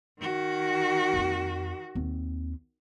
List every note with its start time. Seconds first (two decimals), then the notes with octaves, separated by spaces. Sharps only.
0.21 D#3 F#4
1.13 F2 A#3
1.95 D#2 C4